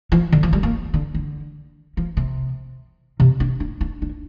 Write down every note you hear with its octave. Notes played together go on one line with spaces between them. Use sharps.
F3
D3
F3
G3
A#3
D3
D3
F3
C3
C3
D4
D4
D4
D4